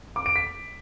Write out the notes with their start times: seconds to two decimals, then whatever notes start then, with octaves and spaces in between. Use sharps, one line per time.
0.16 D6
0.26 D7
0.36 B6